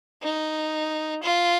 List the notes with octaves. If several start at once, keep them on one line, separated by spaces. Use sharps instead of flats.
D#4
F4